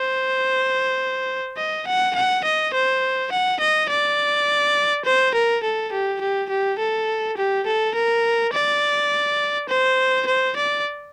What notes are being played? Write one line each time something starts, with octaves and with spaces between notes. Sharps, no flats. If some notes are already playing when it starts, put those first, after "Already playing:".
Already playing: C5
D#5
F#5
F#5
D#5
C5
F#5
D#5
D5
C5
A#4
A4
G4
G4
G4
A4
G4
A4
A#4
D5
C5
C5
D5